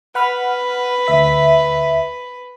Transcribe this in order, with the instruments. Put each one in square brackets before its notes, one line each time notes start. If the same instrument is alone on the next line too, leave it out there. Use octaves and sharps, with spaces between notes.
[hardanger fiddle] B4 [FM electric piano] F#5 B5 F6
[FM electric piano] D2 E5 B6